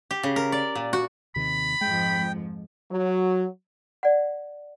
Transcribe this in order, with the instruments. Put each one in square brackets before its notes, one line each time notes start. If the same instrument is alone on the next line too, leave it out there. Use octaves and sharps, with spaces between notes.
[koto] G4
C#3
A#4
D5
A#2
F#4
[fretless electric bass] D#2 C3 D#3 [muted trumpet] B5
[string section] F2 G#2 F3 [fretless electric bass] G#3 [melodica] G5
[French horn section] F#3
[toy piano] D5 F#5